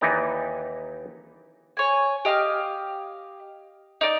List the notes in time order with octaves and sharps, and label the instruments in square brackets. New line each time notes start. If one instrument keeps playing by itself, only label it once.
[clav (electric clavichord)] D#2 E3 D#4 G4 D5 A#5
[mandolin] C#5 G#5
G4 D#5 F5 F6
D#4 D5 G6